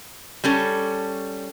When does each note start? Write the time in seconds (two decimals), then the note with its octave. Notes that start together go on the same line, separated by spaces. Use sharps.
0.44 G3 C#4 A4